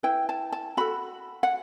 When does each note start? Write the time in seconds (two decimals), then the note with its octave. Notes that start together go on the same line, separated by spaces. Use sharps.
0.03 E4 B4 G5
0.29 A5
0.52 A5
0.77 F#4 A4 B5
1.43 F#5